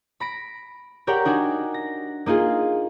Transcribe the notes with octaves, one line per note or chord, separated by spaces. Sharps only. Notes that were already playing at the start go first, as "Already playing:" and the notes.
B5 A#6 D7
G4 A#4 C#5 D5 F#5 G5
D4 D#4 F#4 G#5
A#6
A#3 D#4 F4 G#4